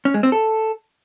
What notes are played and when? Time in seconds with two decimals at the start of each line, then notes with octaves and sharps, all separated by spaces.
0.05 C#4
0.14 G#3
0.23 C4
0.32 A4